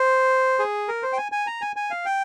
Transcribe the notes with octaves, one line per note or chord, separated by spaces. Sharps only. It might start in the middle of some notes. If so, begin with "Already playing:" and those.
Already playing: C5
G#4
A#4
C5
G5
G#5
G#5
A#5
G#5
G#5
F5
G5